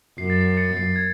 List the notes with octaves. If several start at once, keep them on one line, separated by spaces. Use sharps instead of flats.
F#2 C7
A6
C7
A6 C#7
C7
G#6